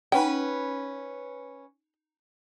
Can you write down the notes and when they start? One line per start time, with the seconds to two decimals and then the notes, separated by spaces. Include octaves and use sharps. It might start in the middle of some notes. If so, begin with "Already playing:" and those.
0.12 C#4 D#4 B4 F#5 G5